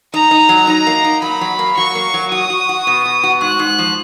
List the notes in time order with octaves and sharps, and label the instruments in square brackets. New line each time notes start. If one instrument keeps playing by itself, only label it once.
[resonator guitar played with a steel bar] D#4 [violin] A#5
[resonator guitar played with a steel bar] D#4
F#3
[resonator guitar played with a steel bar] D#4 [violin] A#5
[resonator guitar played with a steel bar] A#3
D#4
[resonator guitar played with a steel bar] F#3 [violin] B5
[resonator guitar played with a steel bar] F#3
A#3
[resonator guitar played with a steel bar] F#3 [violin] C#6
[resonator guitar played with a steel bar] A#3
F#3
[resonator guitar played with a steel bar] F#4 [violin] D#6
[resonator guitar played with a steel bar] F#4
F#4
B2
B2
F#4
[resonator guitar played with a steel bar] G#2 [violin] F#6
[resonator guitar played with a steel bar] G#2
F3